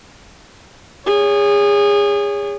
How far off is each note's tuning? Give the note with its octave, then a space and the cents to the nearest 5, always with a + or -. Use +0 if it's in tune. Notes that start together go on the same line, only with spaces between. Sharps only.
G#4 -30 C#5 +25